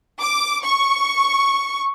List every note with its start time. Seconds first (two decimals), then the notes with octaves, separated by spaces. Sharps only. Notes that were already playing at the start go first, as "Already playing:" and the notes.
0.20 D6
0.63 C#6